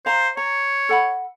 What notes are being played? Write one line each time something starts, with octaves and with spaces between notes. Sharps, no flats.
C5 F5 A#5
C#5 A#5
A4 F#5 B5